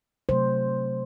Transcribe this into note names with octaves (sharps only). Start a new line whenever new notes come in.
C3 F#3 A3 C5